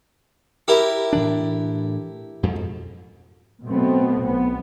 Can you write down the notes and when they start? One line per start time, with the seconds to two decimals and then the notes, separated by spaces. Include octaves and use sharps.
0.68 E4 G4 A#4
1.13 A2 E3 D4
2.43 F2 G#2 B2
3.66 B2 F#3 A3 B3 C4
4.23 B1 B3